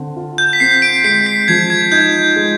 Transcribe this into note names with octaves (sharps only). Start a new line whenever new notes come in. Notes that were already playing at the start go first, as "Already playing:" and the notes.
Already playing: D3 C4
F4
G6
B6
C4 C7
D7
G#3 C7
B6
F3 G#6
G#6
D#4 G6
G#3